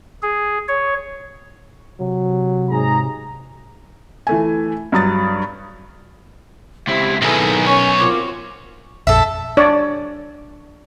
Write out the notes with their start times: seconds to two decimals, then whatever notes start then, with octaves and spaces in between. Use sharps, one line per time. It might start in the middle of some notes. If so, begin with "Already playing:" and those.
0.23 G#4
0.68 C#5
2.00 C3 F#3
2.70 G#2 G#4 A#5
4.27 E3 A3 G#5
4.92 G2 F#3 D#6 A6
6.87 C#2 C4 E4 G4 E5
7.22 B1 D#3 E4 G#4 A4 B4
7.66 C#4 A#4 C#5 G#5
7.98 C4 F4 F#4 A#4 D6
9.07 A#1 F2 A4 E5
9.57 D4 C#5 D5